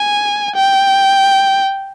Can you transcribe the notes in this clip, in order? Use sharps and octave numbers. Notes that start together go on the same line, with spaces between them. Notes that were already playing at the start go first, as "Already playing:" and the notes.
Already playing: G#5
G5